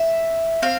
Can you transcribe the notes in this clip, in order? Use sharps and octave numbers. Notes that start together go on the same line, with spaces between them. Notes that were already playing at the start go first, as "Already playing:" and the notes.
Already playing: E5
C4 F5